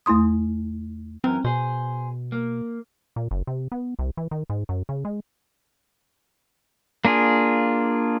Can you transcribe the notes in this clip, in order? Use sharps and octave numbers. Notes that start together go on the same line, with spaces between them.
E2 A3 E4 C6 D#6
F#2 E3 C4 A#4
B2 G#4 C5
A#3
A#2
F#1
C3
B3
C2
E3
D#3
G#2
F#2
C#3
G#3
A#3 D4 F4 G#4